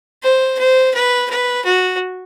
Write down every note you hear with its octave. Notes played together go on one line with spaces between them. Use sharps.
C5
C5
B4
B4
F#4